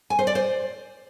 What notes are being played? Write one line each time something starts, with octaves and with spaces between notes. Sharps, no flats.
G#5
C5
D5
C5